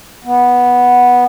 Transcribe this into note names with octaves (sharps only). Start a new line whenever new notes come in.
B3